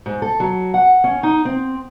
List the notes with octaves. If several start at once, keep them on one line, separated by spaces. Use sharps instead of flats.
G#2
A4
F#3
F#5
C#4
D#4
C4